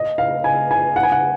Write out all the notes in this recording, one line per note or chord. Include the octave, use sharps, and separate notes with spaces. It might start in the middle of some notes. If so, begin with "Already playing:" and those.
Already playing: D#5
F5
G#5
G#5
F#5
G#5
F#5